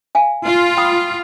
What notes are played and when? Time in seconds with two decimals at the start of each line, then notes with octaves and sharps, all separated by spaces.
0.15 F5 G#5
0.44 F4
0.77 G5 B5 D#6